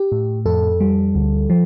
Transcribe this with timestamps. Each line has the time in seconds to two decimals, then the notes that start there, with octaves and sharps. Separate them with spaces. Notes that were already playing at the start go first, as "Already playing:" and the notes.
Already playing: G4
0.12 A2
0.45 F2 A4
0.80 G3
1.15 D2
1.50 F3